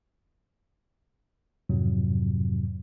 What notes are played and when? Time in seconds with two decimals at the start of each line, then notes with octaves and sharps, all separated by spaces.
1.69 F2 G#2 C3 F#3